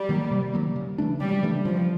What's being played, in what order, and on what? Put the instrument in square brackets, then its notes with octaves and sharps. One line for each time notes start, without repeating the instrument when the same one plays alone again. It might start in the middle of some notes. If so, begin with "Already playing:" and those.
Already playing: [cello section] G3
[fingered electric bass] D#3 F#3 A#3
C3
D#3 F#3 A#3
C#3
E3 A3 D4
[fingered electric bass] C#3 [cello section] G3
[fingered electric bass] E3 A3 D4
[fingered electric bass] C#3 [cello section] F3